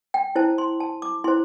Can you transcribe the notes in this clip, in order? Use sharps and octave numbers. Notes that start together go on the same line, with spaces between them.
G5
E4 C5 A5
C6
A5
D6
E4 C5 C6